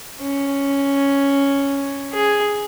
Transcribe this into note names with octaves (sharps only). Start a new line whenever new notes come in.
C#4
G#4